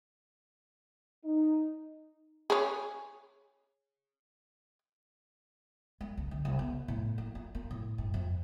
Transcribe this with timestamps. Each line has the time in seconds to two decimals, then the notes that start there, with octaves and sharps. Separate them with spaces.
1.25 D#4
2.50 G#4 C#5
6.01 G#3
6.17 C#2
6.31 D3
6.45 C2
6.59 B3
6.88 A2
7.18 A#3
7.35 F4
7.55 A#3
7.71 A2
7.98 G2
8.14 F2